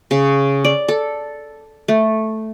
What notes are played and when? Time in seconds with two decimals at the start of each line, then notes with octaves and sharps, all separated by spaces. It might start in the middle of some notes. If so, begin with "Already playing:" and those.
0.11 C#3
0.64 D5
0.88 A4
1.88 A3